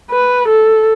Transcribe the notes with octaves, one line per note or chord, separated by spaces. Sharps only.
B4
A4